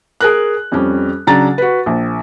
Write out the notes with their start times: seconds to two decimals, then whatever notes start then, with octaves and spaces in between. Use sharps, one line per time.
0.21 G#4 A#4 F#6
0.72 F2 G3 C#4
1.27 C#3 F#3 D4 A#5 A6
1.58 F#4 B4
1.86 A#1